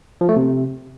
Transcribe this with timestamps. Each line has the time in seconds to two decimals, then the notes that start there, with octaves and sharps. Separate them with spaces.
0.21 F3
0.29 A3
0.36 C3